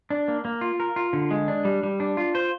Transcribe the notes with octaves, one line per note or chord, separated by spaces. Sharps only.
D4
A#3
A#3
F4
A#4
F4
D3
G#3
D4
G3
G3
D4
F4
C5